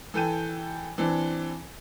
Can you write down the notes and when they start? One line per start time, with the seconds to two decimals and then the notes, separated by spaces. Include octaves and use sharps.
0.14 E3 A4 G5 D#7
0.98 E3 C4 D4